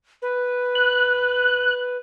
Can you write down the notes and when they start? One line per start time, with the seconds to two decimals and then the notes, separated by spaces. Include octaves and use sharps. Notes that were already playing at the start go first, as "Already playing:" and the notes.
0.22 B4
0.75 F#6